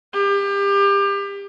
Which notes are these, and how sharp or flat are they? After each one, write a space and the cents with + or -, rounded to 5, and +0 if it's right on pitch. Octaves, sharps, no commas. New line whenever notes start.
G4 +30